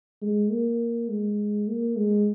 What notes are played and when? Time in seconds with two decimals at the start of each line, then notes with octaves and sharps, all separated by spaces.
0.22 G#3
0.51 A#3
1.09 G#3
1.68 A#3
1.96 G#3